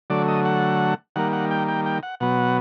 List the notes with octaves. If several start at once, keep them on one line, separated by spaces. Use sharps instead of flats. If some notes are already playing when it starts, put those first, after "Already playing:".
D3 F#3 A3 D5
D#5
F#5
D#3 G3 A#3 F#5
F#5
G5
G5
G5
F#5
B2 F#3 B3 F#5